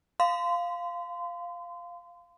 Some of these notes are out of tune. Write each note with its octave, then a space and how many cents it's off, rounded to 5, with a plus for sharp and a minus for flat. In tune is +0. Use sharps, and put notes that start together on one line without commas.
F5 +0 C6 -30